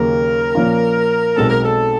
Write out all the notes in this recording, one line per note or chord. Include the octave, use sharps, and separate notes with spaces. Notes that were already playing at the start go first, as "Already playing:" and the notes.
Already playing: D#2 C#3 F#3 A#3 A#4
A#2 F3 A#3 C#4 F4
B1 B2 G#3 C4 A4
A#4
A4